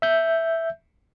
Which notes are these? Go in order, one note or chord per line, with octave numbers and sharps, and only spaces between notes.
E5 G6